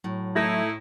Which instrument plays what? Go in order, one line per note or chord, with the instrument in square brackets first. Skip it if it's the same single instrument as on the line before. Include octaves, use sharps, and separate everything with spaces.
[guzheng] A2 [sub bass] F#3
[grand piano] A3 A4 A#6 [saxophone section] D#4 E4